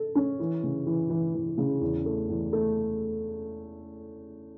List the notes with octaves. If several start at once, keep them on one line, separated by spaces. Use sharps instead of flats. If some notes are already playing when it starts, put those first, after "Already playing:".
Already playing: A4
C#4
E3
C#3
E3
E3
E3
C#3
E2
A3
E2
A3